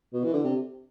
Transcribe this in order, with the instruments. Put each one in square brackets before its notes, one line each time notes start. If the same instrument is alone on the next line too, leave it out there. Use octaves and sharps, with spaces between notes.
[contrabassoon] B2
E3
D3
C3